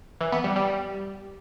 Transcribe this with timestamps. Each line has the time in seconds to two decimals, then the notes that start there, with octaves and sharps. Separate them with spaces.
0.21 E3
0.32 B3
0.44 G3
0.56 G3